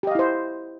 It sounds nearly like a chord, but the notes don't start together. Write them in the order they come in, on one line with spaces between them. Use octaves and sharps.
G4 D#5 F5 E4 C5